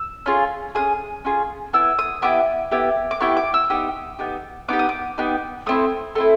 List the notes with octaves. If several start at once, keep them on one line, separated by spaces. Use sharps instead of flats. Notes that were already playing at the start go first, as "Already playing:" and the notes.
Already playing: E6
C#4 F4 G#4
C#4 F4 G#4 D#6
C#4 F4 G#4
B3 E4 E6
D#6
B3 E4 G4 D6
B3 E4 G4
D6
B3 E4 G4 C#6
D6
E6
B3 D#4 G4 D#6
B3 D#4 G4
B3 D#4 G4 D6
D#6
D6
B3 D#4 G4
A3 C4 E4 D#6
A3 C4 E4